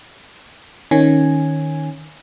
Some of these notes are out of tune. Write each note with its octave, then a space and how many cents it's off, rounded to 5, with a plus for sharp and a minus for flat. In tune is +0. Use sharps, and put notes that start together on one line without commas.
D#3 +0 C#4 -10 G#5 +0